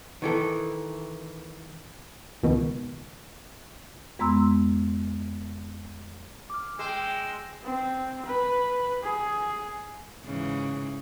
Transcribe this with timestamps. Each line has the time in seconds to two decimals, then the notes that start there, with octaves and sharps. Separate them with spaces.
0.22 D#3 E3 A4
2.43 C#2 B2 D#3
4.19 F2 G#3 B3 A#5 C6 E6
6.50 D6 F6
6.79 G#3 G5 C6 E6
7.63 C4
8.26 B4
9.03 G#4
10.24 G#2 C#3 E3